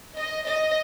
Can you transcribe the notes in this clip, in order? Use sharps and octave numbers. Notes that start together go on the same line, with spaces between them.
D#5
D#5